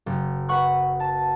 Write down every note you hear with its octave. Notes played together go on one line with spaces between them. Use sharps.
F#1
B4 F#5 C#6 F#6
A5